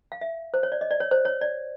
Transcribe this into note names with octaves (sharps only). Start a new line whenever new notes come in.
F5
E5
C5
C#5
D5
D#5
D5
C#5
C5
C#5
D5